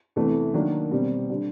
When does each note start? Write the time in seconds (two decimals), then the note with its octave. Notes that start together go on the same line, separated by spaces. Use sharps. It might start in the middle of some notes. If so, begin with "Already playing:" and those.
0.16 E2 C3 E3 A3
0.54 D#3 F#3 A#3 D4
0.91 B2 G3 C4
1.30 D3 G3